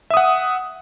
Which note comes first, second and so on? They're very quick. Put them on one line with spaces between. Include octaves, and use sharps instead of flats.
E5 D#6 F#5